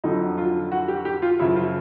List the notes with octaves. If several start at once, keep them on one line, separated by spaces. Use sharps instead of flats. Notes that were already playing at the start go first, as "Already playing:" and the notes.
F2 D3 F#3 D#4
F4
F#4
G4
G4
F4
F#2 C#3 F3 E4
F4